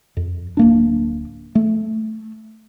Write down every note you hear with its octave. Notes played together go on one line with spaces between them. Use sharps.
F2
D1 A#3 D4
A3